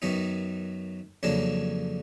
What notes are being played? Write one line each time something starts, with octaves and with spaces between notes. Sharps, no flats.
F#2 D#3 F#3 B3 D#4
F2 C#3 F#3 A#3 D4